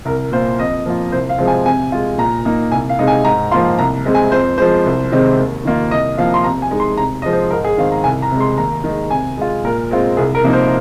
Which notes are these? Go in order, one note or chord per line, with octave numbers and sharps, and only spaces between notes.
C2 A#4
A#2 A#3 F4 C5
F2 D#5
F3 A#3 F4
C2 C5
F5
C3 F3 G#3 C4
G#5
C3 G#5
G#3 F4
A#2 A#5
A#3 D#4
C2 G#5
F5
C3 G#3 D#4
G#5
G#2 A#5
F3 A#3 F4 C6
C2 A#5
C3 G#3 C4
G#5
F2 C5
F3 G#3 C5
C2
C3 D#3 G#3 C4
D#2
D#3 A#3 F4
C2 D#5
C3 F3 A#3 F4 F5
C6
C3 A#5
G#5
G#3 D#4
C6
C3 A#5
F3 G#3 D#5
C5
G#2 A#4
G#4
D#3 C4 D#4 F5
A#5
C2 G#5
A#5
C3 G#3
C6
D#2 A#5
D#3 G#3
C3 G#5
G#3 F4
A#2 A#4
G#3 C4 F4
C2 G#4
A#4
C3 F3 A#3 D#4
C5